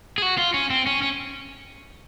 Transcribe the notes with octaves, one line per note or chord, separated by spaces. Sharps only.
G#4
F#4
F4
C#4
C4
C#4
C#4